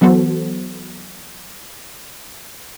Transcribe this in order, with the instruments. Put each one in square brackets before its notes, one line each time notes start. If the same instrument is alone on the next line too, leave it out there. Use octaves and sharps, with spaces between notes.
[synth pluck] E3 F#3 B3 F#4 A4 C5